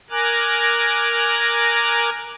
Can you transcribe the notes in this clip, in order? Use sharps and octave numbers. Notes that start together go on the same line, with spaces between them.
A#4 G#5 A#5 D6 F#6